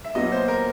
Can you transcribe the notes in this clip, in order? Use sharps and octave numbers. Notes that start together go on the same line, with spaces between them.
E5
A#2 F#3 B3 D#5
C5
A#4